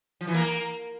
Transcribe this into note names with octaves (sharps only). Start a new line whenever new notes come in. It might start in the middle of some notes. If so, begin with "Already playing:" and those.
F3
E3
A#3